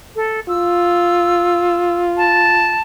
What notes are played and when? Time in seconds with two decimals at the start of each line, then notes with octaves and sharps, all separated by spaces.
0.16 A4
0.48 F4 E6
2.17 A5